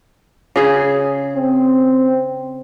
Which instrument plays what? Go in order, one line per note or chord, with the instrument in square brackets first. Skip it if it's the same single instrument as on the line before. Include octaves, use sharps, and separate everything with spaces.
[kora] C#3 G#4
[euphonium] C4